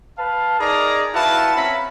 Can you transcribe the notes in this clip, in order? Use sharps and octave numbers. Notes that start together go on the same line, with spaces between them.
B4 F5 A5
D#4 G#4 A#4 D5 A#5
E4 F#4 B4 F5 A5
C4 C#4 E5 A#5 B5